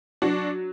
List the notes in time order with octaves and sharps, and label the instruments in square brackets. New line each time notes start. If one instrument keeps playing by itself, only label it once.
[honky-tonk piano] F#3 D4 F#4